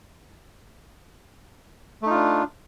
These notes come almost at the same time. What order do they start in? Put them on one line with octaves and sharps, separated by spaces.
A3 D#4 F4 D4